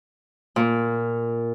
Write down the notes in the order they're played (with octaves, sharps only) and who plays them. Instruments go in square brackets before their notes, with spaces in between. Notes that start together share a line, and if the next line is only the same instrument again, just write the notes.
[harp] A#2